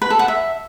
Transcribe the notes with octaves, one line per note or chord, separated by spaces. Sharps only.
B4
A4
F#5
E5